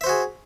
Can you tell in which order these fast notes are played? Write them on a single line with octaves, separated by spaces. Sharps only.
E5 C5 F#4 G#4